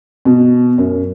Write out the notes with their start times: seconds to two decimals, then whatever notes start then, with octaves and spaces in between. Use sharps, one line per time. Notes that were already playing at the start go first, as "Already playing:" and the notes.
0.25 B2
0.78 F#2